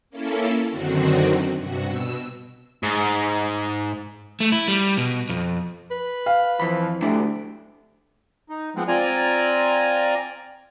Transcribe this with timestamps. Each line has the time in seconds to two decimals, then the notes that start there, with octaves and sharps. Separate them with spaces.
0.10 A#3 C#4 E4 A4
0.69 F#2 D3 D#3 C4 F#4
1.56 G2 C3 F#4
1.85 B2 E6
2.83 G#2
4.40 A3
4.52 E4
4.68 G3
4.98 B2
5.29 F2
5.91 B4
6.26 F5
6.60 F2 E3 F3 B5
7.02 D2 A3 D4 E4 G4
8.49 D#4
8.76 F3 G#3 B3 C4
8.88 C4 F4 D5 G#5 A#5